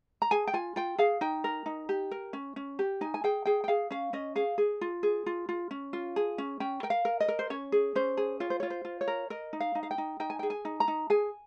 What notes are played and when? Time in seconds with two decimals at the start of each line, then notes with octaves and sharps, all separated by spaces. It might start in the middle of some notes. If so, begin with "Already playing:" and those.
0.22 A#5
0.31 G#4 G#5
0.47 G5
0.53 F4 G#5
0.76 F4 G5
0.98 G#4 F5
1.21 D#4 G5
1.44 A#4
1.66 D#4
1.89 G4
2.11 A#4
2.33 C#4
2.56 C#4
2.79 G4
3.01 D#4 G#5
3.14 G#5
3.24 G#4 G5
3.45 G#4 G5
3.64 G5
3.68 G#4 F5
3.90 C#4 F5
4.13 C#4 D#5
4.36 G#4 F5
4.58 G#4
4.81 F4
5.03 G#4
5.26 F4
5.49 F4
5.71 C#4
5.93 F4
6.16 G#4
6.38 C#4
6.60 C#4 G5
6.83 A#4 G5
6.90 F5
7.05 A#4
7.20 D#5
7.28 A#4
7.39 C5
7.50 C#4 C#5
7.72 G#4
7.95 C#4 C5
8.17 G#4
8.40 F4 C#5
8.50 C5
8.60 F4 C#5
8.70 C5
8.85 F4
9.01 C#5
9.08 A#4
9.30 A#4 D#5
9.53 D#4
9.60 F5
9.75 D#4
9.83 F5
9.91 G5
9.98 D#4
10.20 D#4 G5
10.30 G#5
10.39 G#4 G5
10.50 G#5
10.65 D#4
10.80 A#5
10.88 D#4
11.10 G#4 G#5